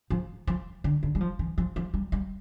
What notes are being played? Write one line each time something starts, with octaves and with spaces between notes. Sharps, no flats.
F3
F3
D3
D3
G3
F3
E3
F3
F3
G3
G3